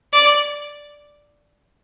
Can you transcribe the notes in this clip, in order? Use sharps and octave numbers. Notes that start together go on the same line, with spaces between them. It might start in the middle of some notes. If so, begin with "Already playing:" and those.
D5